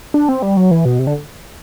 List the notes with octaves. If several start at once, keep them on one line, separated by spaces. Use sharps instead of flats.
D4
C4
G3
F#3
E3
B2
C3
D3